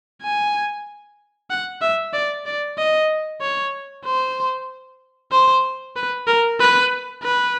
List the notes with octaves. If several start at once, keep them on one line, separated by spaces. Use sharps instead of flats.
G#5
F#5
E5
D5
D5
D#5
C#5
C5
C5
B4
A#4
B4
B4